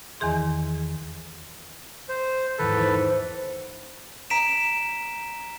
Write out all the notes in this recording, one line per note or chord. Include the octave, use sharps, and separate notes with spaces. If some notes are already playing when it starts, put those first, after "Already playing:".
E2 D#3 E3 G#4 C6
C5
E2 G#2 D#3 A4 B4
E2 C5
A#5 B6 D7 E7